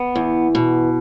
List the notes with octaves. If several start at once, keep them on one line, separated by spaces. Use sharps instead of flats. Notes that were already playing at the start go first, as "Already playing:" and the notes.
Already playing: B3
E2
B2